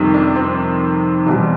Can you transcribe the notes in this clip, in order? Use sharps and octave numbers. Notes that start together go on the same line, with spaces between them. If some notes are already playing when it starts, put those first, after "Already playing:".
Already playing: F2 C3 D#3 G3
D4
C4
E2 B2 G3